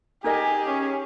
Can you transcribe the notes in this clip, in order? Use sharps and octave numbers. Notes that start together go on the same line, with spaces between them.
D#4 G4 G#4 A#4 D#5 G#5
C#4